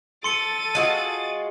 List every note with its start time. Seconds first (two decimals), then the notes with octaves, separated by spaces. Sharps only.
0.24 A4 C6 A6 C#7 D#7 G7
0.75 G#3 F4 F#4